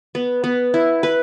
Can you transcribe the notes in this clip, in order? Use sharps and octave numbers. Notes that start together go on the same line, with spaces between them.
B3
B3
E4
B4